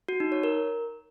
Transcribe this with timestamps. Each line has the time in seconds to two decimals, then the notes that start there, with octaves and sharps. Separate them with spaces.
0.09 F#4
0.20 D#4
0.32 C#5
0.43 A#4